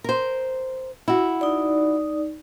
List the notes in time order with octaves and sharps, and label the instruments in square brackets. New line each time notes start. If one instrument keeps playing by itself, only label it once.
[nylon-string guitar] A#4 C5
E4 F#4
[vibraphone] D#4 D5